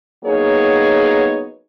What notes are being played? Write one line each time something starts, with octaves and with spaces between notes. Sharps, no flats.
F#3 A#3 B3 D#4 G#4 C#5